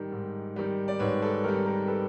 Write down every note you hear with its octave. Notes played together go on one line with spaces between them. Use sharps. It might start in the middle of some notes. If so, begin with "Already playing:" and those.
Already playing: G#2 D#3 G3
G#2
D#3 G3
D5
G#2 B4 C#5
A4 B4
D#3 G3 A#4
A#4
A4 B4